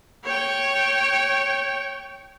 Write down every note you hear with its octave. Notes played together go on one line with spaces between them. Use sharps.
C#5 G5